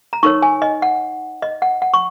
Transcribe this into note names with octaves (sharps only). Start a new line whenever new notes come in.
A#5
D#4 A#4 C#5 C#6
G#5
D#5
F#5
D#5
F#5
F#5
C#6